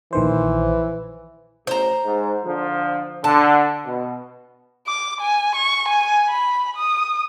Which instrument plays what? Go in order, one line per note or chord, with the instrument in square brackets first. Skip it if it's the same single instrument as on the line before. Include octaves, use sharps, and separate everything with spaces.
[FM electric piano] A#1 D#3 C5 [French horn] E3
[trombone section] A1 [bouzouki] C5 A#5
[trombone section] G#2
D3 F3
[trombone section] D3 [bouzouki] A5
[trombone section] B2
[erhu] D6
G#5
C#6
G#5
B5
D#6